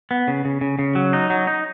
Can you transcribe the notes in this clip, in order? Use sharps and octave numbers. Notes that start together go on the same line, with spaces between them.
B3
C#3
C#3
C#3
C#3
F#3
D#4
F#3
D#4